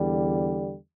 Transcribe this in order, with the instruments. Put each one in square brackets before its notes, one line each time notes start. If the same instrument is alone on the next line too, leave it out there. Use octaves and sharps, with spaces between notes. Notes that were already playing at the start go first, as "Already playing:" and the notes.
Already playing: [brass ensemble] E2 D3 G3